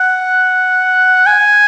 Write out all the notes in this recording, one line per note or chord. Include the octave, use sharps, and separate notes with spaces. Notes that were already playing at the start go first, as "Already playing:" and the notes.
Already playing: F#5
G#5